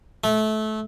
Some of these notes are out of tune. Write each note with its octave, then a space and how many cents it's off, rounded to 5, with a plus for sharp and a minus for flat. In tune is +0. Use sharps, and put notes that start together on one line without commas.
A3 -25